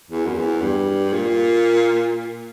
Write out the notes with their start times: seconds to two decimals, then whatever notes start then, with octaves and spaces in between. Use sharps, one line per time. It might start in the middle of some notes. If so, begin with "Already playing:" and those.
0.10 E2
0.26 F#2
0.36 E2
0.62 G2
1.13 A#2